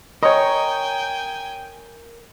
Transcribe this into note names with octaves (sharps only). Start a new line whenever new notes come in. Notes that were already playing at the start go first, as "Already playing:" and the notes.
A#4 C#5 D#5 G5 G#5